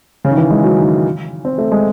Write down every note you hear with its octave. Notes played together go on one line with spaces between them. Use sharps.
C#3
D#3
E3
G#3
F#3
D#3
C4
A3
G#3